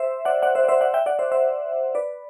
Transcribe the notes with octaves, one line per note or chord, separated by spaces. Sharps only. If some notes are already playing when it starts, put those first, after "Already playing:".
Already playing: C5 E5
D5 F#5
D5 F#5
C5 E5
D5
C5 E5
D5 F#5
E5 G5
D5 F#5
C5 E5
C5 E5
B4 D5